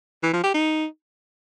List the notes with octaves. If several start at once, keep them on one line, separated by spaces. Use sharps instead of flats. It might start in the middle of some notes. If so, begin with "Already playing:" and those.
E3
F3
G4
D#4